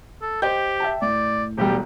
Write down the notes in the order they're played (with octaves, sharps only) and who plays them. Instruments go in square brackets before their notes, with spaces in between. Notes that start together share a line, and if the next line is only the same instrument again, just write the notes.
[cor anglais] A4
[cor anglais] G4 [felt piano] C5 D#5 G5 [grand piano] G6
[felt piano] E5 G5 A5
[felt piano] A2 [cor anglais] D5
[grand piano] E1 B1 G3 [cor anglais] G4